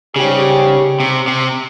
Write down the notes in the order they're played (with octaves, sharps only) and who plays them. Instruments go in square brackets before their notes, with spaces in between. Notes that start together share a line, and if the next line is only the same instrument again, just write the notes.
[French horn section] G#2 G3 C#4 G4 [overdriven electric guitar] C#3
[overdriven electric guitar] C3
C3